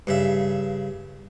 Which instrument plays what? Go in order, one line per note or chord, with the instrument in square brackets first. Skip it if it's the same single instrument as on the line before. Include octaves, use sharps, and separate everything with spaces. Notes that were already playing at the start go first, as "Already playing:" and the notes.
[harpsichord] G2 C#3 E5